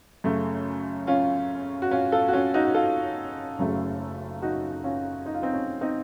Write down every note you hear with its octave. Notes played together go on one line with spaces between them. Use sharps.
F#2 C#3 A3
C#4 F4
F#4
C#4 F4
F4 A4
F#4
C#4 F4
D#4 F#4
F#4
F4 A4
F#1 F#2 C#3 F#3 A3
D#4 F#4
C#4 F4
D#4
F4
C4 D#4
C#4
C4 D#4